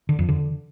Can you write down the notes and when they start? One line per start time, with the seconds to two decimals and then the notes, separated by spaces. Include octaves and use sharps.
0.09 D3
0.19 F2
0.29 D3